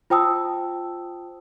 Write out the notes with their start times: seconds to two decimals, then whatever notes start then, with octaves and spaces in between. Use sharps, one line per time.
0.10 F4 C5 G5 A5 D#6 E6